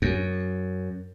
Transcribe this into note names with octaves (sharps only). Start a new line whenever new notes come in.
F#2